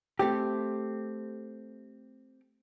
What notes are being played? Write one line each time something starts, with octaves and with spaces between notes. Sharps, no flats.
A3 C4 G4